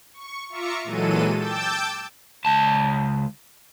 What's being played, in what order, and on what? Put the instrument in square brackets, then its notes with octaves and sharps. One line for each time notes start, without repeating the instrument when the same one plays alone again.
[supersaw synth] C#6
F4 E5 A#5 C#6 D6 C#7
A#2 E3 F#3 G#3 A4 D#7
G5 A5 D6 E6 G6 A6
[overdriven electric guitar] C#2 A5